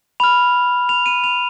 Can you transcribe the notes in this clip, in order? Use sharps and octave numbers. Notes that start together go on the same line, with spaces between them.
B5 F6 F7
F7
D#7
F7